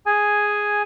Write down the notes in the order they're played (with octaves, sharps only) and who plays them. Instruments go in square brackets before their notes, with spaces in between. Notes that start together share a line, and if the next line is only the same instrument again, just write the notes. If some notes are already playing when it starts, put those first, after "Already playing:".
[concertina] G#4 G#5